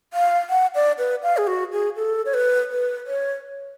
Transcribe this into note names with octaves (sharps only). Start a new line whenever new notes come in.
F5
F#5
D5
B4
F5
G#4
F#4
G#4
A4
C#5
B4
B4
C#5